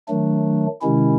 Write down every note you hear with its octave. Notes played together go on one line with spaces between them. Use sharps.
D#3 F#3 A3 D4
C3 D#3 G#3 C#4 E4